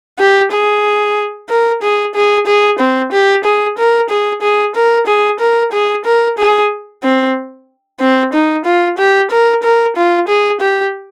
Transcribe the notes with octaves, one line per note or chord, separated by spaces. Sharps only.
G4
G#4
A#4
G#4
G#4
G#4
C4
G4
G#4
A#4
G#4
G#4
A#4
G#4
A#4
G#4
A#4
G#4
C4
C4
D#4
F4
G4
A#4
A#4
F4
G#4
G4